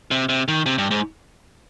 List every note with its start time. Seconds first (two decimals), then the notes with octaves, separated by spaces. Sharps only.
0.11 C3
0.29 C3
0.48 D#3
0.66 C3
0.78 G2
0.91 G#2